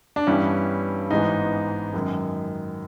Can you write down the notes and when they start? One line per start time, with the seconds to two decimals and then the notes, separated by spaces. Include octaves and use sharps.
0.16 D4
0.27 G2 E3 G3 B3 C#4
1.10 A1 G#2 E3 G#3 B3 D#4
1.94 F#2 D#3 G#3